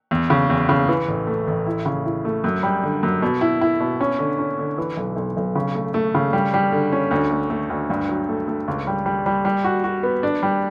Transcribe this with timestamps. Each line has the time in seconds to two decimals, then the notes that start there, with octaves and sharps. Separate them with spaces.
0.11 E2
0.30 C#3
0.50 E2
0.69 C#3
0.88 E3
1.08 A1
1.27 A3
1.47 A1
1.67 E4
1.86 C#3
2.05 E4
2.25 A3
2.44 F#2
2.63 G3
2.83 D3
3.03 F#2
3.22 B2
3.41 E4
3.61 E4
3.80 B2
4.01 C#4
4.19 D3
4.39 C#4
4.59 D3
4.78 E3
4.97 B1
5.16 B1
5.37 B1
5.55 C#3
5.75 A3
5.94 A3
6.15 C#3
6.33 G3
6.54 G3
6.72 D3
6.92 C#4
7.11 D2
7.31 A3
7.50 A3
7.70 D2
7.90 G2
8.09 F#3
8.29 A3
8.48 A3
8.68 C#2
8.87 G3
9.06 G3
9.26 G3
9.45 G3
9.64 F#4
9.84 F#4
10.03 B3
10.23 D4
10.43 G3